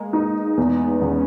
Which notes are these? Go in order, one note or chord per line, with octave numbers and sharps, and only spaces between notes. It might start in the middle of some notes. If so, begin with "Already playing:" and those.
Already playing: G#3 A#3
D#4
E2 B3
E2 C#4